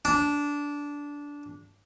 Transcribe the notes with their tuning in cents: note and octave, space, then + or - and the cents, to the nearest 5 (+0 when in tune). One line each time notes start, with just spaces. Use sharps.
D4 -15